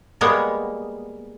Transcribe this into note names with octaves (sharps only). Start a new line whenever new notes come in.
G3 G#3 A#3 B3 C#5